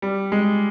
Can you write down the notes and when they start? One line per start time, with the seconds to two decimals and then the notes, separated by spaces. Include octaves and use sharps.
0.02 G3
0.32 G#3